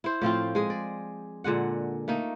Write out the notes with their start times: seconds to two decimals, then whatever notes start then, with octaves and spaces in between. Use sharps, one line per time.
0.04 E4 C5
0.21 A2 F3 C4 F4
0.55 G#3 G#4
0.70 D5
1.44 A#2 D3 G#3 F#5
2.08 A3 A#3 D#4